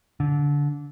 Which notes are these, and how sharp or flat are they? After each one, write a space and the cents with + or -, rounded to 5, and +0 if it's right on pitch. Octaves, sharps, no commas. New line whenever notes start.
D3 -25